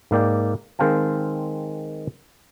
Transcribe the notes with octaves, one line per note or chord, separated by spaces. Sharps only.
G#2 A#3 D5 G5
D#3 G#3 C4 F5 G5 A5